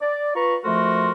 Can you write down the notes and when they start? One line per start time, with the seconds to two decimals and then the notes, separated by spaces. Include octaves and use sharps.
0.01 D5
0.35 F4 B4 A#5 C#6
0.64 F2 F3 A3 F#4 A#4 C6